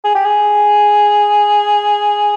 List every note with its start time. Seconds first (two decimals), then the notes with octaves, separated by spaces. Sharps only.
0.04 G#4
0.15 G4
0.25 G#4